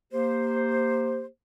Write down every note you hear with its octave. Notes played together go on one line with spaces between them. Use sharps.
A#3 G4 C5